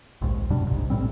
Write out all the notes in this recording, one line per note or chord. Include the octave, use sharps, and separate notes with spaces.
A#1 D#2 G#2
F#2 B2 G3 D4
F#1 C2 G#2
A#1 A2 G3 C4